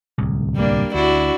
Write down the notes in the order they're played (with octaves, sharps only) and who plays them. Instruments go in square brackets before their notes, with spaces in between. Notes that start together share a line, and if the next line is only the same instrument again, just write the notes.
[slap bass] D1 C2
[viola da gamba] G3 A#3 D4
[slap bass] D2 [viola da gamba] D4 E4 F#4